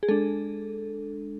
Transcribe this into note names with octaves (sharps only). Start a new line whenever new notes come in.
G#4
G#3 D4 A4